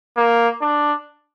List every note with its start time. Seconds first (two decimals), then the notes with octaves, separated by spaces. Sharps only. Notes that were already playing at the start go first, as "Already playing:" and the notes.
0.17 A#3
0.62 D4